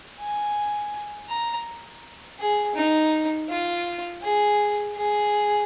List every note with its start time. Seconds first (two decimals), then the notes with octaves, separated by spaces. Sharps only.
0.19 G#5
1.29 A#5
2.39 G#4
2.75 D#4
3.49 F4
4.22 G#4
4.95 G#4